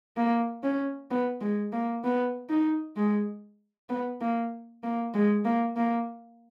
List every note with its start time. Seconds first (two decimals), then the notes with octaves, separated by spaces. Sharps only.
0.17 A#3
0.63 C#4
1.11 B3
1.41 G#3
1.72 A#3
2.04 B3
2.50 D#4
2.97 G#3
3.89 B3
4.21 A#3
4.83 A#3
5.14 G#3
5.45 A#3
5.76 A#3